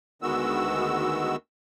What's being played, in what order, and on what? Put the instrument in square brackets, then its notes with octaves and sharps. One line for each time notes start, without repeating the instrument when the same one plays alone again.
[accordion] D2 D#3 G#3 B3 F#4 E6